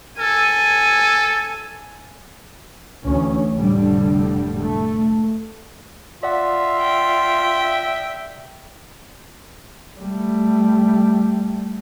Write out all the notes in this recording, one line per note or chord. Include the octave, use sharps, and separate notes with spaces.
A4 G#5
D2 E3 C#4
F1 A2 D3 G3
A3
F4 D5 E5 F#5
G5
G3 A3